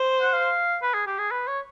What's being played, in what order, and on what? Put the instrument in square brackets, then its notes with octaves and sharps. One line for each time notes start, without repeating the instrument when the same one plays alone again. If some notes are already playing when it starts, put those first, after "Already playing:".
Already playing: [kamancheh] C5
[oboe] F#5
F5
B4
G#4
G4
G#4
B4
C#5